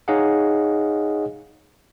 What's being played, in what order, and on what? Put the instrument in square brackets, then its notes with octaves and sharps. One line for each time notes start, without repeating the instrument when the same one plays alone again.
[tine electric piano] D#4 G#4 C#5 D#5 F5 F#5